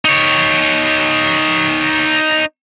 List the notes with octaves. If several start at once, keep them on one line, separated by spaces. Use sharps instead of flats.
D#4 C#5